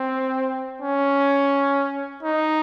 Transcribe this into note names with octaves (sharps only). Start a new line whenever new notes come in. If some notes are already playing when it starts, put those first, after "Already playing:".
Already playing: C4
C#4
D#4